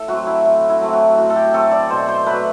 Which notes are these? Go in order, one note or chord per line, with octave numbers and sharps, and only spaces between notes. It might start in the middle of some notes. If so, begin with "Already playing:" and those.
Already playing: A2 A4
F#3 A3 C4 F#4
E4
A2
E4
F#3 A3 C4
F#4
A2 F#4
A4
G4
F#3 A3 C4 A4
D5
B2 C5
C5
F#3 A3 B4